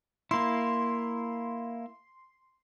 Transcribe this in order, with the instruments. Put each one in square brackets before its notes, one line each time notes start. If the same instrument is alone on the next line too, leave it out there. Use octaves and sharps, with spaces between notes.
[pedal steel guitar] A#3 E4 [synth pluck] C6